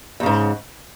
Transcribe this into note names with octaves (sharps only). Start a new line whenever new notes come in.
E2 G#2 C#3